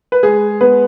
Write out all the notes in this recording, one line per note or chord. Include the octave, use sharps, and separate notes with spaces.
B4
G#3 G#4
B3 B4